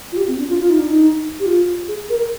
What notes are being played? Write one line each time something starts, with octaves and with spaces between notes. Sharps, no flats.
F4
G4
C4
D4
F4
F4
D#4
D4
D#4
G4
F4
G#4
A#4